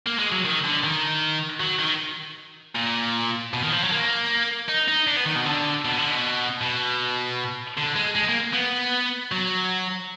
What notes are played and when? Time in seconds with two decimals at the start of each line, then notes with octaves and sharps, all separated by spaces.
0.07 A#3
0.19 G#3
0.32 F#3
0.45 D#3
0.64 D3
0.84 D#3
1.60 F#3
1.79 D#3
2.76 A#2
3.53 B2
3.63 D#3
3.72 F3
3.82 F#3
3.92 A#3
4.69 D#4
4.88 D#4
5.07 D4
5.17 B3
5.26 D#3
5.35 B2
5.45 D3
5.85 B2
5.98 D3
6.11 B2
6.61 B2
7.77 D3
7.96 G#3
8.16 G#3
8.29 A#3
8.53 B3
9.32 F#3